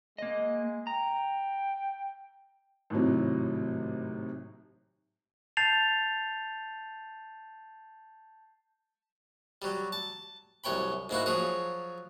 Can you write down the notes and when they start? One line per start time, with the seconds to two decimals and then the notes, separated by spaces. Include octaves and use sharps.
0.18 G#3 A#3 D#5
0.87 G5 A#5
2.90 G#1 A2 C3 F#3
5.57 A5 G6 A6 C7 F7
9.62 F#3 G3
9.92 A5
10.64 C2 F#2 C#5 G5 B5
11.09 G#2 A#3 E4 F#4
11.26 F3 F#3 G#4 C#5